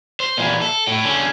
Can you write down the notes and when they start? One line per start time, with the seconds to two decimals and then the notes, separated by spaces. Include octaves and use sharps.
0.20 C5
0.37 A#2 E3
0.61 A4
0.87 A2
1.05 D3 C#4